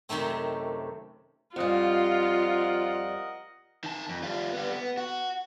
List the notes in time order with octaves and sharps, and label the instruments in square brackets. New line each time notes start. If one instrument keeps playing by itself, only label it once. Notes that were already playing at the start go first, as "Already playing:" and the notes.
[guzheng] F#2 C3 D#3 A3 C4
[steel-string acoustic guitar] F2 G3 [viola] F4 [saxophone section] A#4 D#5 F#5
[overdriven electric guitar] D#3 A5
F2
G3 F4
G3 B3
B3
F#4